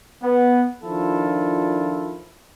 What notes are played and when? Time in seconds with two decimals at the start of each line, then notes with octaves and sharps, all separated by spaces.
0.23 B3
0.83 D#3 F3 D4 E4 F4 A4